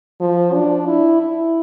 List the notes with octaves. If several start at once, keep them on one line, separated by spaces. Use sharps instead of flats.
F3
D4
E4
E4